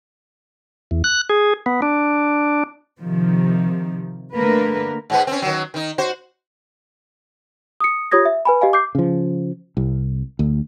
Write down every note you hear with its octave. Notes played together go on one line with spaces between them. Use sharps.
E2
F#6
G#4
B3
D4
C3 D#3 F3
D3 A3 A#3 A#4 B4
G#2 G#3 B3
C4 C#4
D#3 F#3
D#3 D#4
F#4 C5
D#6 C#7
F4 G4 C#5 D#6 G#6 A#6
E5
B4 G#5 B5
G4 D#5 F5 G#5
D6 G6 C7
C#3 F3
C2
D2